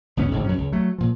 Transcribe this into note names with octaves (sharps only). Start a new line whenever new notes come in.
C#2 G2 B3 C#4
A1 G#2 D3
F2 F#3 C#4
C#2
F#3 A3
A#2 F3